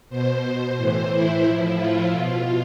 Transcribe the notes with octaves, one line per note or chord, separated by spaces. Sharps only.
B2 C5
C5
A2 E3
E4
A2 F3
F4
B2